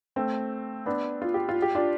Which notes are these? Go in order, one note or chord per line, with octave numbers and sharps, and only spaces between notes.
A3 C4
B3 D4
F4
G4
F4
G4
D4 F4